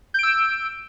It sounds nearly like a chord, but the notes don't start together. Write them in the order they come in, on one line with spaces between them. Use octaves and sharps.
G6 D7 E6